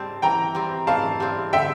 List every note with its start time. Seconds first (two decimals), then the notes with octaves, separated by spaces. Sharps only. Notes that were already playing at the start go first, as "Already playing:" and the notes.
Already playing: G3 C4 A5
0.22 E3 G5 A#5
0.55 G3 C4
0.87 E3 F5 A5
1.20 G3 C4
1.53 D3 E5 G5